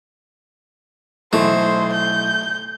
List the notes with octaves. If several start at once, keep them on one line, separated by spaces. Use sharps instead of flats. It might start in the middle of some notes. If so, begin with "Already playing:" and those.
B1 E3 A3 C5
G6